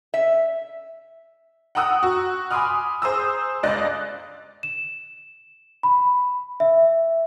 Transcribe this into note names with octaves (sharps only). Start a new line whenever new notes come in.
E5
F#5 G5 A#5 D#6 E6 F#6
F#4
G#5 B5 C6 D6 D#6 F6
G#4 C5 A#5 D#6 E6
G1 C#2 D5 D#5 F#6
E7
B5
E5